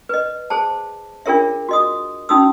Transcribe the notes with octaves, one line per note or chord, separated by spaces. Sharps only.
B4 D#5
G#4 C5 A5
D4 F4 G#4 A#4 C#5 E5
F#4 D#5 D#6
C#4 D#4 F#4 D#6 E6